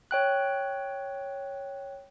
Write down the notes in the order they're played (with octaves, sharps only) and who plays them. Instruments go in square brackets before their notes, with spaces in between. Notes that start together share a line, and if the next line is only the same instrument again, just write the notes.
[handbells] C#5 G5 F#6